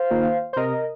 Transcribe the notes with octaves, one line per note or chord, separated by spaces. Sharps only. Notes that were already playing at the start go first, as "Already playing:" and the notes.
Already playing: C5 F5
D#3 A#3 F4
C5
C3 A#4 D#5